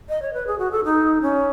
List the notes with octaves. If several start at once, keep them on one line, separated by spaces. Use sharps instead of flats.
D#5
C#5
B4
G#4
F#4
A4
D#4
C#4